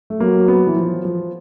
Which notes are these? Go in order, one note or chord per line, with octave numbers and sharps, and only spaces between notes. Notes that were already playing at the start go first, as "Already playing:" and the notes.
A3
F#3 A#3
B3
E3
F3
F3